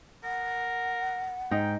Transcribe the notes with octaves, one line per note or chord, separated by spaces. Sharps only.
A#4 F#5
G#2 D#4 G5